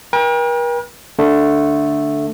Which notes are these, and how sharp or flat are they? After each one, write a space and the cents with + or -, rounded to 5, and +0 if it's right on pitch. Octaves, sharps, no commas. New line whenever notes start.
A#4 +45 G5 +35
D3 +0 A3 +0